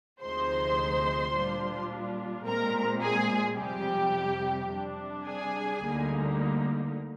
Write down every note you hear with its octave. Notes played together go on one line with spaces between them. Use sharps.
D2 C3 F3 G#3 D#4 C5 C6
A#2 G3 D4 F4
A#2 G#3 C4 A#4 A#5
G#4 G#5
F2 C3 G3 G4 G5
C3 G3 D4
G#4 G#5
D2 D3 G3 A#3 D#4